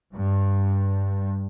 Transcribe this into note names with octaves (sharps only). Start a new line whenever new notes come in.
G2